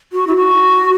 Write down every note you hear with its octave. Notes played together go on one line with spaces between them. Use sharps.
F#4
E4
F#4